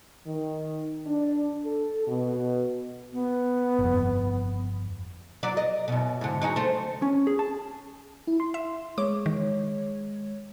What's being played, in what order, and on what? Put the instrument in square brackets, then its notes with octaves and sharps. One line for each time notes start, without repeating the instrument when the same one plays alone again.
[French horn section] D#3
D4
A4
B2
[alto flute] B3
[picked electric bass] G1 F2
[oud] F#3 D5
D#5
F#2 B2
G#2 D3
F#3 D#4 G#4
A3 C5
[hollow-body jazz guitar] C#4
G#4
A5
[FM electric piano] E4
C6
[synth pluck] E5
[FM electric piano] G#3 C#5 [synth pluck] D6
[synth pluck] D#3